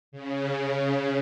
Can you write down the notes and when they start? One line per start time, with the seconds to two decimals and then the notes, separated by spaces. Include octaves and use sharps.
0.12 C#3